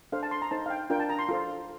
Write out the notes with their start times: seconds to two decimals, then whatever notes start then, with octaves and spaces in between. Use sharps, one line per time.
0.12 D4 A4 C5 F5
0.23 A5
0.31 C6
0.42 A#5
0.51 D#4 A4 C5 A5
0.66 F5
0.70 G5
0.90 D4 F4 A#4 G5
0.99 A5
1.10 A#5
1.19 C6
1.29 F4 A4 C5